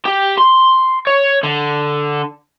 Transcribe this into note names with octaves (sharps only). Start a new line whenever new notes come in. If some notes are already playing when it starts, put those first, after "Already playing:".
G4
C6
C#5
D3